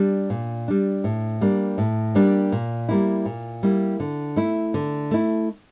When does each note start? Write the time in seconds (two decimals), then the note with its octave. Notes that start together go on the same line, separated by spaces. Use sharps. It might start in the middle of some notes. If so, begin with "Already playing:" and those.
Already playing: G3 D4
0.30 A#2
0.68 G3 D4
1.04 A2
1.41 G3 A#3 D4
1.78 A2
2.15 G3 A#3 D4
2.52 A#2
2.89 G3 A#3 E4
3.25 A#2
3.63 G3 A#3 E4
4.00 D3
4.36 A3 E4
4.74 D3
5.11 A3 E4